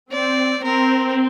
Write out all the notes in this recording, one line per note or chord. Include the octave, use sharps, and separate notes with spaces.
C4 D5
C4 A#4